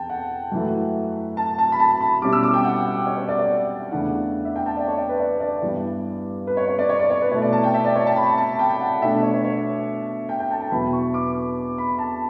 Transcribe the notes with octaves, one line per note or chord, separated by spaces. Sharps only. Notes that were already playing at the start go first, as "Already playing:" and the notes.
Already playing: E2 G5 A5
F#5
F#2 E3 A3
A5
A5
B5
A5
B5
B2 G3 C#4 E4 D6
E6
D6
G5
F#5
F#5
C#5
C#5
D5
D5
E2 C#3 E3 A3 D4 F#5
E5
G5
A5
D5
C#5
D5
B4
D5
D5
G2 E3 B3
B4
C#5
C#5
D5
C#5
D5
C#5
B4
B2 A3 E4 C#5
D5
A5
G5
E5
D5
C#5
A5
B5
A5
G5
F#5
B2 A3 D4 E5
C#5
C#5
C#5
G5
G5
A5
A5
E2 B2 F#3 B3 E4 B5
C#6
D6
B5
A5